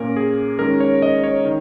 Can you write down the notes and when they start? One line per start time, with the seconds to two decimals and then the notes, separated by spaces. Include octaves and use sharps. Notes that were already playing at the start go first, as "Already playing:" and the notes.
Already playing: A#2 A#3 C#4 A#4
0.16 G#4
0.59 D#3 G#3 C#4 A#4
0.80 C#5
1.02 D#5
1.24 C#5
1.45 D#3